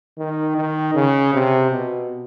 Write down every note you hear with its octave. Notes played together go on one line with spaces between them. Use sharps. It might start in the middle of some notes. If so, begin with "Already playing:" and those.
D#3
D#3
C#3
C3
B2